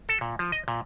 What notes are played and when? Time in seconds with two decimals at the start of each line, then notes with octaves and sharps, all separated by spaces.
0.09 A4
0.21 A#2
0.39 F3
0.52 D#5
0.68 A#2